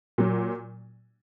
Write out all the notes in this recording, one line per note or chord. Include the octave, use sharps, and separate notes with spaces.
A#2 F#3